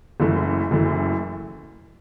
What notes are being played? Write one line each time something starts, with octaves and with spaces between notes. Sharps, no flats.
F#1 F#2 E3 A3
F#1 F#2 E3 A3